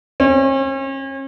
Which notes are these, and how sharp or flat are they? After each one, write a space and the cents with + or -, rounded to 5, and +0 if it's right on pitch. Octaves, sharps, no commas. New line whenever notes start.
C#4 -40